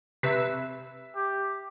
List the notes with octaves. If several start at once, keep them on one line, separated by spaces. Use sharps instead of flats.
C3 B4 E5 E6 B6
G4